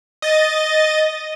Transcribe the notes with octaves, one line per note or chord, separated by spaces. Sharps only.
D#5 A6